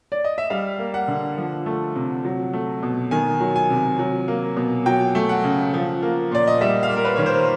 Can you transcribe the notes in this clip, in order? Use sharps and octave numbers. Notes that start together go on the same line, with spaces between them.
D5
D#5
E5
G3 F5
A#3
F#5
D3
F3
A3
C3
F#3
A3
B2
D#3 G#5
F#3
G#5
C3
F#3
A#3
B2
F#3 G5
A3
F#5
C#3
F3
A#3
A#2 D5
D#5
G3 E5
F5
A#3
A#4
B4
D#3 C#5
C5